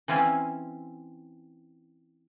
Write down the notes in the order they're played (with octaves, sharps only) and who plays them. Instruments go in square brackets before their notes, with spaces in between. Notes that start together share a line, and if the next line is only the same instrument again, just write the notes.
[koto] E3 C4 C#4 E4 F4